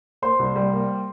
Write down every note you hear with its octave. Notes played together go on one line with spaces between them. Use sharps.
A#3 C5 C6
C2
G3
A#3